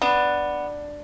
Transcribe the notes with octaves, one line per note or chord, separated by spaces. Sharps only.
B3 D4